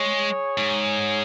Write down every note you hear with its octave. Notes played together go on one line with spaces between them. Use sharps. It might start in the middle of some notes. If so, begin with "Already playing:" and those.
Already playing: G#3 G#4 C#5
G#2